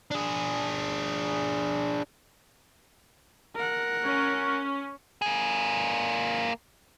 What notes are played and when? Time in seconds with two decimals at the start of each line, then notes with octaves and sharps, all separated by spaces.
0.11 D4 G#4
3.56 A#4 F#5
4.04 C#4
5.22 A#3 G#4